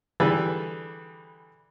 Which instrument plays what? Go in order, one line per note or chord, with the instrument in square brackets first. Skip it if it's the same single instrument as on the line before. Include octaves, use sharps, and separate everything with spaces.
[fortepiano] D3 E3 G3 G#4 A4 B4